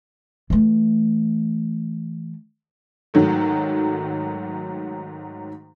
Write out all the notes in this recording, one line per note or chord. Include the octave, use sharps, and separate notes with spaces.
E3 A3
G#2 D#3 F#3 A3